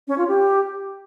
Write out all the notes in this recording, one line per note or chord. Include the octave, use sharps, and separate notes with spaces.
C#4
F4
G4